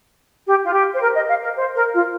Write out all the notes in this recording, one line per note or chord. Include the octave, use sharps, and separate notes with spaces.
G4
F4
G4
C5
A#4
D#5
F5
A#4
C5
A#4
F4